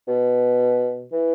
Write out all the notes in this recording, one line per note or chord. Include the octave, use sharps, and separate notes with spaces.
B2
E3